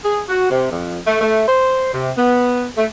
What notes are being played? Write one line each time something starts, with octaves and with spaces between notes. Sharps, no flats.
G#4
F#4
C3
F2
A3
A3
C5
C3
B3
A3